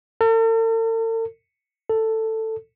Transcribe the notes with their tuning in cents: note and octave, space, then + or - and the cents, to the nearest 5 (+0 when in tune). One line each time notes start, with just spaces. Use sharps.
A4 +45
A4 +10